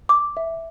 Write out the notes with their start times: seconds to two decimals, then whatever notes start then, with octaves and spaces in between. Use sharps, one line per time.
0.09 D6
0.37 E5